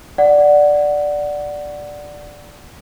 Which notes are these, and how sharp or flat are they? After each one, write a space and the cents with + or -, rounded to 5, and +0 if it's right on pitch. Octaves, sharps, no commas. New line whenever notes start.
D5 +0 F#5 +0